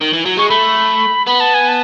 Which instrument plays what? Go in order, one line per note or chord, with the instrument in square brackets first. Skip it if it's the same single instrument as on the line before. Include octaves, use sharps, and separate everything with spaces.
[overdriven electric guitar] D#3
E3
F#3
[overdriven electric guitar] G#3 [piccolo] C#6
[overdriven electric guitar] A3 [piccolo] B5
[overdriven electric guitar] B3 [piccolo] B5
[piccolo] A5
G#5
A5